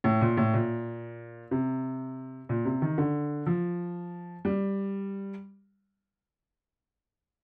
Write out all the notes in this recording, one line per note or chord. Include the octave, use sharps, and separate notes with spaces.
A2
A#2
A2
A#2
C3
A#2
C3
D#3
D3
F3
G3